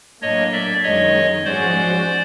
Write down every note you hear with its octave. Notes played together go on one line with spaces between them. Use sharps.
A2 F#3 A#3 D4 C#5 D#5
D5 E5
F#2 D#3 G#3 C#5 D#5
G#2 F3 G#3 C#4 F#4 C5 D5